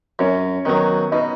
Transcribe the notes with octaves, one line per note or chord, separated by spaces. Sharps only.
F#2 C#4 C#5
D#3 F#3 B3 B4
B2 D#4 D#5